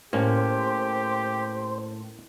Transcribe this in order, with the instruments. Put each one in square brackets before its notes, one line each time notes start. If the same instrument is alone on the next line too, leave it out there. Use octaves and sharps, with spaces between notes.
[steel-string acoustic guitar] A2 [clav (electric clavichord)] A#3 C#4 [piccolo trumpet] G4 [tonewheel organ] C5